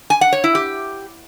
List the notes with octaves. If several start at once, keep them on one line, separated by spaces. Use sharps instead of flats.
G#5
F#5
C#5
E4
G4